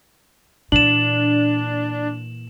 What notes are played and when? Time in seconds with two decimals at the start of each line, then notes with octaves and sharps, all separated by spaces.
0.72 A#2 E3 D4 E7 F#7